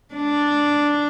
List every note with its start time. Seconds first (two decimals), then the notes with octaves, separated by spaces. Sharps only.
0.15 D4